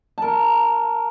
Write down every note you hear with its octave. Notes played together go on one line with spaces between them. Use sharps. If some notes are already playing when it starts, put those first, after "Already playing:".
A#4 A5